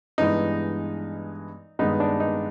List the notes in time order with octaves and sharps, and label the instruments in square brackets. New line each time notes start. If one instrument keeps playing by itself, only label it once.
[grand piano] G2 E3 G#3 B3 [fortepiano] D#4
[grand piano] G2 D#3 G#3 B3 [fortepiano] D#4
[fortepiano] D4
D#4